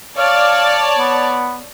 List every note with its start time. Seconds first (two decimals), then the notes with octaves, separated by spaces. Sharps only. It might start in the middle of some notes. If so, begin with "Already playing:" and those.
0.18 C#5 D5 F5 A5
0.99 B3